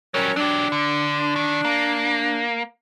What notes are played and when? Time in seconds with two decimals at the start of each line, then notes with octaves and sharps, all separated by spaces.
0.14 F#3 G3 C#4 A#4 C#5
0.36 F#3 D4 G4
0.72 D3
1.36 D#3
1.65 A#3